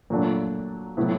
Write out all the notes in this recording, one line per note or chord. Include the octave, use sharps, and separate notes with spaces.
A#2 F#3 A3 D4
A2 F#3 B3 E4